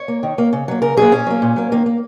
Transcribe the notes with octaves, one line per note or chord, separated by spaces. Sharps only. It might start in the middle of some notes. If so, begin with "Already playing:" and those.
Already playing: C#5
A#3
D#3
A#3
C#3
F#3 A#3
C#3 A#4
F#3 A#3 G#4
A#2 C#4
F#3 A#3
A#2
F#3 A#3
D#3 A#3
A#3